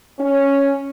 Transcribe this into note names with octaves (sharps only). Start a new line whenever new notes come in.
C#4